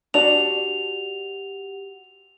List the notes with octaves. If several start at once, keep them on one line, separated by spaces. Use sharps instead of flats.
D4 F#4 G4 D5 F#5 F7